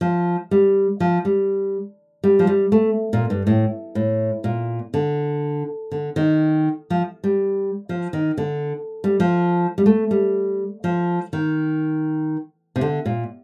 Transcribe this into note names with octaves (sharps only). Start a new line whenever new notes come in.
F3
G3
F3
G3
G3
F3
G3
A3
A#2
G2
A2
A2
A#2
D3
D3
D#3
F3
G3
F3
D#3
D3
G3
F3
G3
A3
G3
F3
D#3
C3
D3
A#2